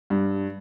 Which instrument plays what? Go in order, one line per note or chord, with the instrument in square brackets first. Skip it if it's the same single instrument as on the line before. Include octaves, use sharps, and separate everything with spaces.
[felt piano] G2